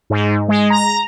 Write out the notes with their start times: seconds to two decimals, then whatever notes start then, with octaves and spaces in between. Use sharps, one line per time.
0.10 G#2
0.48 G#3
0.70 A#5